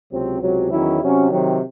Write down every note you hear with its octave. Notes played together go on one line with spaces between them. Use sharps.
C#2 C3 F#3 C4
C#2 C3 F#3
E2 D#3 F#3 C#4 E4
C3 F#3 C#4
C3 D#3 F#3